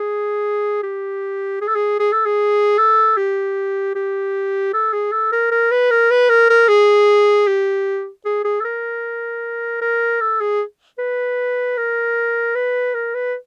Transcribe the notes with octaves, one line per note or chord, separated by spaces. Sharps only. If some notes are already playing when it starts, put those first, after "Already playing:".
Already playing: G#4
G4
G#4
A4
G#4
G#4
A4
G#4
A4
G4
G4
A4
G#4
A4
A#4
A#4
B4
A#4
B4
A#4
A#4
G#4
G4
G#4
G#4
A4
A#4
A#4
A4
G#4
B4
A#4
B4
A#4
B4